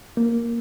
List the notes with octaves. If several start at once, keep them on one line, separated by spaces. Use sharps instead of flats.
A#3